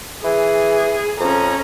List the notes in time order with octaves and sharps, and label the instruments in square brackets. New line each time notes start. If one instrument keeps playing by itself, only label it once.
[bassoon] E3 [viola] G#4
[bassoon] F2 [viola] C#4 A#5